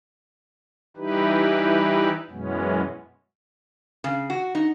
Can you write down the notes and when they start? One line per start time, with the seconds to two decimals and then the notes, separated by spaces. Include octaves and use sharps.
0.97 E3 G3 D#4 E4 G4 B4
2.31 F#2 B2 E3 G#3 B3 C#4
4.04 C#3
4.30 F#4
4.55 D#4